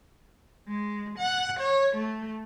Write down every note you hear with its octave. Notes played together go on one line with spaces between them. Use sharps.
G#3
F#5
C#5
A3